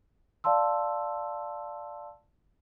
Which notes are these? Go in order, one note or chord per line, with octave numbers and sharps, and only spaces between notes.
D5 F5 A5 C6 E6